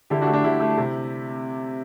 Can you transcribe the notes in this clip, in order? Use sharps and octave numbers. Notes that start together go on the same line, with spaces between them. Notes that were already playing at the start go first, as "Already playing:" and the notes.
D3 E4 G4
D4 F#4
A3
D4 F#4
D3 E4 G4
A3
C3